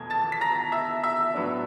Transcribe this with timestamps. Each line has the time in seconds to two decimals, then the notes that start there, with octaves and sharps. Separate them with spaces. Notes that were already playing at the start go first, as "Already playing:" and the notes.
Already playing: E2 B2 A3 G#6
0.10 A5 A6
0.32 B6
0.41 A#5 A#6
0.72 E5 E6
1.04 E5 E6
1.34 A2 F#3 B3 D4